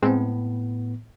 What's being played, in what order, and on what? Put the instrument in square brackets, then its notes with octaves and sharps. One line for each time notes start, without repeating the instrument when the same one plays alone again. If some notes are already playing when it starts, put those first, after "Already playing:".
[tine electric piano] A2 B3 [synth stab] G#3 C4